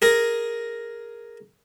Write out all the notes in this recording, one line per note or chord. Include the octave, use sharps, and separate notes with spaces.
G#4 A#4